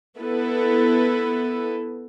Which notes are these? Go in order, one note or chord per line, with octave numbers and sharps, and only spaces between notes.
B3 E4 A4 B4